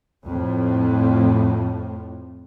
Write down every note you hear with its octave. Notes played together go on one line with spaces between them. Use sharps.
F2 A2